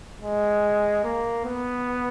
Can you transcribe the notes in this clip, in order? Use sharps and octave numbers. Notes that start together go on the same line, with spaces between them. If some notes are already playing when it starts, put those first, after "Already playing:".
G#3
A#3
B3